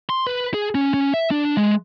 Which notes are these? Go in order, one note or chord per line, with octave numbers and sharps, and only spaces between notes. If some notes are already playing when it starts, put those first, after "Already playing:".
C6
B4
G#4
C#4
C#4
E5
D4
G#3